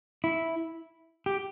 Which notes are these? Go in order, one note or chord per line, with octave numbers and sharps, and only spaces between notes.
E4
G4